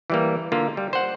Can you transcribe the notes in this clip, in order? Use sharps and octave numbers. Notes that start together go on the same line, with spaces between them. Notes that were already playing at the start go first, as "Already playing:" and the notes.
E3 G3 A#3
D3 A#3 F4
G3
C5 F#5